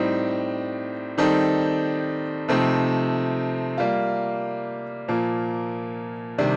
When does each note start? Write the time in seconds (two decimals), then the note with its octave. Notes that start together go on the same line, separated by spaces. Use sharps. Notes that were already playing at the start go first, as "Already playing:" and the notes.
Already playing: A2 G3 C4 D#4
1.18 D#3 G3 C4 D#4 A4
2.48 C3 F3 A3 C4 D#4
3.78 G3 A#3 F4
5.08 A#2 F3 A#3
6.38 C3 D#3 G3 D4